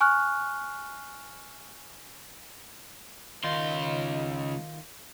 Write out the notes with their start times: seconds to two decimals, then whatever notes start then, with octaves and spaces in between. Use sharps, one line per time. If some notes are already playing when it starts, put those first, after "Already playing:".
0.01 G#5 C#6 F6 F#6
3.44 C#2 D#3 D#4 F4 C6